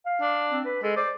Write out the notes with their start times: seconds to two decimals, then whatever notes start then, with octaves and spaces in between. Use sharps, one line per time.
0.06 F5
0.21 D4
0.51 C4
0.65 B4
0.83 G#3 A4
0.97 C5 D5